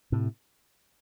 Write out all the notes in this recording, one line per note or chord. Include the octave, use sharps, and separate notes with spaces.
A2 C3